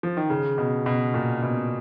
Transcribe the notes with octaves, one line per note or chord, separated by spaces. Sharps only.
F3
D#3
C#3
B2
B2
A#2
B2